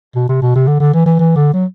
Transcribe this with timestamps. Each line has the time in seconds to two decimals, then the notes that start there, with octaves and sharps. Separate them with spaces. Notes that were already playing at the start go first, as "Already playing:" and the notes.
0.16 B2
0.29 C3
0.42 B2
0.55 C3
0.68 D3
0.80 D3
0.94 E3
1.06 E3
1.19 E3
1.36 D3
1.53 F#3